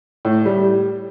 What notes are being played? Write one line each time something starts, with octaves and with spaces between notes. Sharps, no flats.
A2
G3